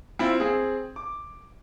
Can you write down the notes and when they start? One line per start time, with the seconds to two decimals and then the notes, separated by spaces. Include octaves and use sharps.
0.19 C4 E4 F4
0.40 C4 G#4
0.96 D6